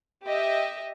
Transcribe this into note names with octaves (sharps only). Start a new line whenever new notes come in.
G4 D#5 E5